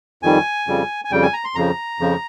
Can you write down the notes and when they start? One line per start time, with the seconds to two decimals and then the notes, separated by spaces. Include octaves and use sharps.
0.23 F2 D#3 G3 G#5
0.67 F2 C#3 G3
1.05 G#5
1.11 F2 C#3 G3 G5
1.22 G#5
1.33 A#5
1.45 C6
1.55 F2 C#3 F3 A#5
2.00 F2 C#3 F3